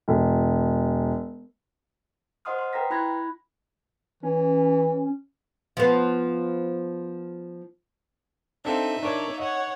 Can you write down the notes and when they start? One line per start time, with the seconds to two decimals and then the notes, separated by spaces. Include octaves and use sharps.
0.08 E1
2.45 C5 D#5 F#5 C6 D#6 F6
2.59 C6
2.73 B4 G5 A#5 A#6 B6
2.90 E4 B5 F#6 G#6 A#6
4.23 E3 C#4
5.77 F3 B3
8.65 C4 D4 D#4 A4 E5 F5
9.03 D4 A#4 C#5 D5
9.39 C#5 D#5 F#5